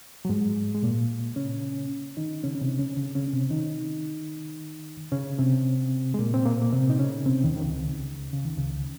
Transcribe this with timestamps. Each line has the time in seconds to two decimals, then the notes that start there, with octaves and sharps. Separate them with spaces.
0.25 F#3
0.29 G#2 G#3
0.75 G#3
0.83 A#2 A#3
1.36 C#3 C#4
2.17 D#3 D#4
2.43 C#3 C#4
2.55 C#4
2.61 C3 C4
2.79 C#3 C#4
2.97 C#3 C#4
3.15 C#3 C#4
3.28 C#4
3.33 C3 C4
3.51 D#3 D#4
5.12 C#3 C#4
5.38 C3 C4
6.14 G#3
6.19 A#2 A#3
6.34 C4
6.45 A#2 A#3
6.62 A#3
6.73 C3 C4
6.90 D#4
6.99 C#3 C#4
7.26 C3 C4
7.44 D#2 D#3
7.56 D#3
7.62 C#2 C#3
8.33 C#3
8.45 D#3
8.57 C#2 C#3